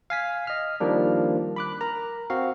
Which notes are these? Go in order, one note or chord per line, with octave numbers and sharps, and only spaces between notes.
F5 G#5 B6
D#5 F6
D#3 F3 G3 A#3 D4
B5 D6 F#6
A#4 A#5
C4 F#4 F5